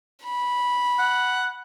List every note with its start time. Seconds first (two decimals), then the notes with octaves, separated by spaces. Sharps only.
0.23 B5
0.99 F#5